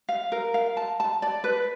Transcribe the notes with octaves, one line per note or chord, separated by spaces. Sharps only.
F5
A#4
F5
A5
A5
D5
B4